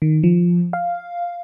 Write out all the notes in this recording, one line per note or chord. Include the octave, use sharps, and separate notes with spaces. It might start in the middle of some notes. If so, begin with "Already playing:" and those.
D#3
F3
F5